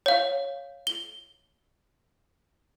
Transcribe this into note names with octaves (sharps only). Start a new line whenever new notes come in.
C#5 F5
G7